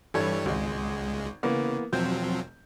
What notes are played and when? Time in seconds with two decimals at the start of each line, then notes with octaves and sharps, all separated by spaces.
0.14 G2 E3 G3 A4 C#5 G#6
0.46 G#1 C#2 G#3
1.43 C#3 E3 A#3 B3
1.92 E1 F3 F#3 C4 G6